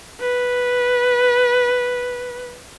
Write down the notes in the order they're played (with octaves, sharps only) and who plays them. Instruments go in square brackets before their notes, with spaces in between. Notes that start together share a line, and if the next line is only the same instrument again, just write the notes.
[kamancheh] B4